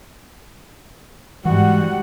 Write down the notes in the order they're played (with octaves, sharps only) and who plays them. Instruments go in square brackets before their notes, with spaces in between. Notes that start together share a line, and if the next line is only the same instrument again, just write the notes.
[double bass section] G#2 [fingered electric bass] E3 [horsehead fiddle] G3 F#5 [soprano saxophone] F#4